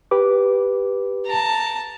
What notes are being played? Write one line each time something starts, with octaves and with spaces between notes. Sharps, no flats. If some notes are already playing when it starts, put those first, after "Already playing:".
G4 B4 D6
A5 A#5